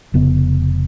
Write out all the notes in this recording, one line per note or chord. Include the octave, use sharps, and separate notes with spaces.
F1 C#3 B3